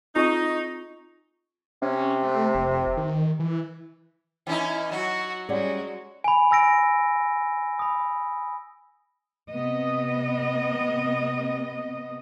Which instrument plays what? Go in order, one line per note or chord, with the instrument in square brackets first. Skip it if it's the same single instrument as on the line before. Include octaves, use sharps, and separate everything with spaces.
[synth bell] C4 F4 C#6 [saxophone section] D#4
[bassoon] C3 [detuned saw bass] C#4
[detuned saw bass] A3
F1
D#3
E3
[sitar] E3 C#4 D#4 [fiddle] E4 [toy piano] G5
[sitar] F#3 [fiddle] F#4 [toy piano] D#5
[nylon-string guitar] G3 C#4 [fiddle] G#3 F#4 [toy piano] G#4 D5 F#5
[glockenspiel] G#5 B5
G#5 E6 A#6 D7
B5 D#6
[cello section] C3 B3 D#5